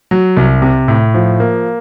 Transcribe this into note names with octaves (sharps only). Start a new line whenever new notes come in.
F#3
C2
C3
A2
F3
A#3